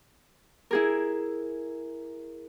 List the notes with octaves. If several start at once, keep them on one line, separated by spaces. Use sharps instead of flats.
E4 G#4 A#4